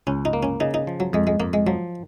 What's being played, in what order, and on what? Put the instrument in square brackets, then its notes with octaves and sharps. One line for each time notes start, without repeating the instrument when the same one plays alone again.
[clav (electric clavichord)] C#2 [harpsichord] C#4
[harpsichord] D#4
[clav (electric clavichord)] A#3
[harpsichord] C#4
[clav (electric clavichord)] C#3 [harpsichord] D#4
[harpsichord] D#4
[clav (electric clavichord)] F3
[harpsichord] F#3
[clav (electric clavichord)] F2 [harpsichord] G#3
[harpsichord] G#3
[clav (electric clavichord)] F2 [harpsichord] A#3
[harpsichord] G#3
[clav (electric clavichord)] F3 [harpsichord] F#3